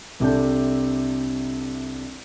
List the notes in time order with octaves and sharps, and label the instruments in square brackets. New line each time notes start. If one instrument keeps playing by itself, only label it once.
[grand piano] C2 C3 D4 A4 G6